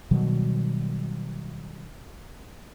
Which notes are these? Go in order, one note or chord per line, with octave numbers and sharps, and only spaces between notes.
B2 D#3 F#3 G3